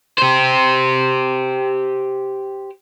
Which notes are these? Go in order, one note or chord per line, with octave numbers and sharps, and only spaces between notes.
G4 C5